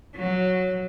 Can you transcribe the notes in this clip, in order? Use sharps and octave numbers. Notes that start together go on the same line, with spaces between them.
F#3